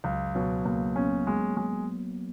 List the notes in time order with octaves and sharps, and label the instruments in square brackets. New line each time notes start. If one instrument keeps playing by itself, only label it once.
[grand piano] C#2 [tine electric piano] F#3
[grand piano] B2 [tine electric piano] F#3
[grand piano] C#2 [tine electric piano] A#3
[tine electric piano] B3 [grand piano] C#4
[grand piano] G#3
G#3